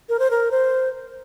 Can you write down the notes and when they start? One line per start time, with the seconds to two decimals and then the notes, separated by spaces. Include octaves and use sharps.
0.09 A#4
0.19 C5
0.31 A#4
0.51 C5